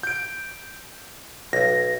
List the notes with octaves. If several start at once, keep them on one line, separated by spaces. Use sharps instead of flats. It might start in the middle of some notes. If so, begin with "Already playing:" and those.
G6 D7
B1 A#6